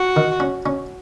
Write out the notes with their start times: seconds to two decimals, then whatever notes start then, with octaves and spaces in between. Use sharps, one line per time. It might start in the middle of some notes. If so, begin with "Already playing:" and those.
Already playing: F#4
0.16 D#3
0.40 C#4
0.66 C#4